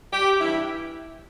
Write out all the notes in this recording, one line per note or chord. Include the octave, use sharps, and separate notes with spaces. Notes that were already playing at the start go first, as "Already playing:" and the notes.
G4
G2 E3 G3 E4